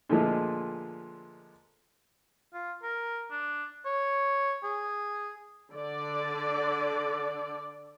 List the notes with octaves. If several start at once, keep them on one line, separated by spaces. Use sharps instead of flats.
A#2 D3 F3 G#3 A3
F4
A#4
D4
C#5
G#4
D3 D5